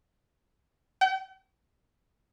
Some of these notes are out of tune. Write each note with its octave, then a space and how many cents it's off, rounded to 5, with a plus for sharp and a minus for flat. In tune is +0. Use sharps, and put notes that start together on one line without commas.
G5 -45